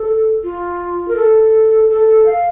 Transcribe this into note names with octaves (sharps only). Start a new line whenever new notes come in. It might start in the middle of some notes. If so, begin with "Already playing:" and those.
Already playing: A4
F4
A#4
A4
A4
F5